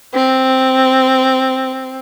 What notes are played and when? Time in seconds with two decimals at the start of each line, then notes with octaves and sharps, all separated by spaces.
0.14 C4